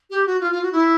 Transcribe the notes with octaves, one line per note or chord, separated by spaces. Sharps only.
G4
F#4
F4
F4
F#4
E4